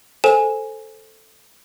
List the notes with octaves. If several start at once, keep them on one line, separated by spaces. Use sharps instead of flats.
A4 C5 G#5 E7